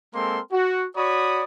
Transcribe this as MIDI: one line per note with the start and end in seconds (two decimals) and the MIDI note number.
0.14 0.39 56
0.14 0.39 58
0.14 0.39 60
0.14 0.39 69
0.14 0.39 70
0.14 0.39 84
0.52 0.86 66
0.96 1.44 66
0.96 1.44 73
0.96 1.44 74
0.96 1.44 83
0.96 1.44 87